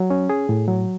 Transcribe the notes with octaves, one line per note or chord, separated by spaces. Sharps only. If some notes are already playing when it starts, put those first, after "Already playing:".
Already playing: F#3
C#4
G#4
A2
F#3